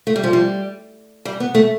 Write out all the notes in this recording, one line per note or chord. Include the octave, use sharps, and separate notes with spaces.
A3
G3
F3
G3
G3
B3
A3